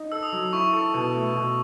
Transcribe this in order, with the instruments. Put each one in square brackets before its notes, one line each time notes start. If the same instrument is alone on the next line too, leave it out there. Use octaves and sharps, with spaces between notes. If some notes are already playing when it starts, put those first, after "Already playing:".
Already playing: [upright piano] D#4
[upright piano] A4 [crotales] E6
[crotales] D#6
[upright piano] F#3
[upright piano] E4 [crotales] C#6
[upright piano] A4
B2
A3
B2